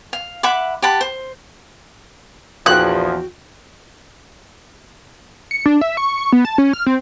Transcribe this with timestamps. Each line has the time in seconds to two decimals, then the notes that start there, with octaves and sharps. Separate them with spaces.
0.13 F5
0.43 E5 F#5 B5 D6
0.82 G4 F#5 A5 B5
1.01 C5
2.66 A#1 E2 F3 F#4 G5 F#6
5.51 C#7
5.66 D4
5.81 E5
5.97 C#6
6.18 C#6
6.32 B3
6.45 A5
6.58 C#4
6.73 F6
6.86 C4